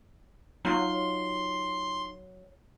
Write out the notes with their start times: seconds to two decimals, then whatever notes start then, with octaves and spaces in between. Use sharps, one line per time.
0.65 F#3 D#4 F4 C6